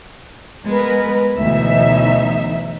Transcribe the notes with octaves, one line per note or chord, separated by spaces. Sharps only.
G#3 B3 A#4 B4
D2 B2 E3 F#3 D#4 E5